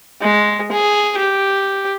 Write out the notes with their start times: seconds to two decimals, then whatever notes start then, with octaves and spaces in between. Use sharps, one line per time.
0.22 G#3
0.72 G#4
1.18 G4